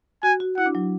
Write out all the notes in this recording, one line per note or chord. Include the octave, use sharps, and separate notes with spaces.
F#4 G#5
F#4
E4 F#5
D4
F#3